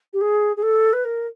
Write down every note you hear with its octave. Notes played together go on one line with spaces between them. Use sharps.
G4
G#4
G#4
A4
B4
A#4